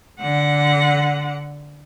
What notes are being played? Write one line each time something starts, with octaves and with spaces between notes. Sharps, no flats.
D3 F#5